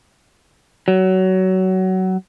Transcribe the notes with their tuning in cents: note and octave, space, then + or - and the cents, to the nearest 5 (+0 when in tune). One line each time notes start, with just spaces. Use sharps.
F#3 +20